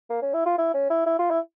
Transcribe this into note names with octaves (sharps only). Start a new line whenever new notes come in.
A#3
C#4
E4
F4
E4
C#4
E4
E4
F4
E4